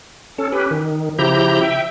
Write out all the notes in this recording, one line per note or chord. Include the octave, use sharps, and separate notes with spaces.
C#4 A4
C#4 G4 B4
D#3
C#3 F3 E4 G4 A#5 G6
E5 G5